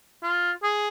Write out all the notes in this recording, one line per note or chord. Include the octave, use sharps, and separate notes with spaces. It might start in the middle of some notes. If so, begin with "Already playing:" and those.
F4
G#4